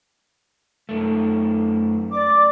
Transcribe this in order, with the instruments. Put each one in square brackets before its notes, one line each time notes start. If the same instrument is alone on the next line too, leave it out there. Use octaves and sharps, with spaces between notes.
[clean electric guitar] F#2 A3
[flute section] D5 D6